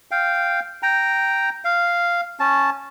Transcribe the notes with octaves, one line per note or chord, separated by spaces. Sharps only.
F5 G5
G5 A#5
F5
C#4 A5